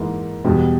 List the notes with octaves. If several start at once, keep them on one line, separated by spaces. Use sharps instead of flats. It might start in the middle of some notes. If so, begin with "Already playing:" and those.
Already playing: G#2 E3 A#3
E2 B2 G3